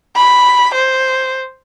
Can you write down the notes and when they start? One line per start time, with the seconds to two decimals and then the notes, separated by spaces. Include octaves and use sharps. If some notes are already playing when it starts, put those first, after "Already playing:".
0.16 B5
0.75 C5